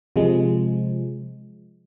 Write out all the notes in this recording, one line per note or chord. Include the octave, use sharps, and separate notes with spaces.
C3 F3 G#3